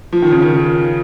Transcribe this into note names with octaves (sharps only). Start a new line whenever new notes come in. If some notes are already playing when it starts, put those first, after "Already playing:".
F3
D#3
C#3
D#3